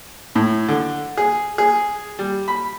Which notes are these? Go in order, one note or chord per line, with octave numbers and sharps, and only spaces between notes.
A2
D3
G#4
G#4
G3
B5